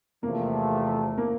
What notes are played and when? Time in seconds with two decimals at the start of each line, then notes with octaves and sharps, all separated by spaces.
0.23 E2 C3 F3 A3 A#3
1.18 A#3